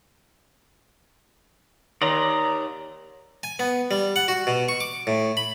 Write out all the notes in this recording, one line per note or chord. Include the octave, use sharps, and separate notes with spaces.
D#2 D5 D#5 A#5
G#5
B3
G3
F#5
F#4
B2
C#6
D6
A2
B5